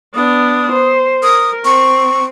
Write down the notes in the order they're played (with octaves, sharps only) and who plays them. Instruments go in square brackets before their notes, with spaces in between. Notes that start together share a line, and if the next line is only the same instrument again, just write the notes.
[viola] B3 D4 [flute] D#6
[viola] C5
[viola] A#4 [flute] D#6
[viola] C4 [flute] C#6